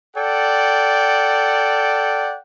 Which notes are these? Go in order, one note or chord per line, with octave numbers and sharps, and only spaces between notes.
A4 D5 F#5 G5